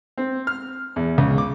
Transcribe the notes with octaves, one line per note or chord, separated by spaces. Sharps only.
C4
F6
E2
C#2
D6